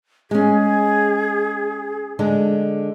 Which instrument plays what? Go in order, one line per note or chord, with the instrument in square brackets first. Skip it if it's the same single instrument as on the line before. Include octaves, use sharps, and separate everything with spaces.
[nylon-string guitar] G#3 C#4 [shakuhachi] G#4
[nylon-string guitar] D3 G#3 D4